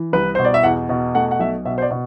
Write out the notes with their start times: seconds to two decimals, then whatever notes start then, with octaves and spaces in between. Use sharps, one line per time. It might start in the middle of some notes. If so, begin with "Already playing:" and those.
Already playing: E3
0.13 C2 B4
0.35 B2 C5
0.45 D5
0.54 E5
0.63 E2 F#5
0.89 B2
1.15 A3 F#5
1.31 F#5
1.40 B1 E5
1.65 B2 E5
1.78 C5
1.82 D5
1.91 B2